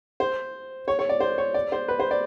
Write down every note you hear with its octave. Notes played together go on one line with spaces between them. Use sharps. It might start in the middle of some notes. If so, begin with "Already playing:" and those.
C5
C#5
C#5
D5
C5
C#5
D5
C5
B4
C5
D5